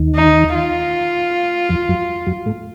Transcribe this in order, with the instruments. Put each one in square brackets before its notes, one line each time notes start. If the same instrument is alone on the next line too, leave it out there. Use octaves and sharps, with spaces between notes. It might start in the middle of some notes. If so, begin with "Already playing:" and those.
Already playing: [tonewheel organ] D#2 D#3
[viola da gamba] D#4
F4
[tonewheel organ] F2 F3
F#2 F#3
F#2 F#3
A2 A3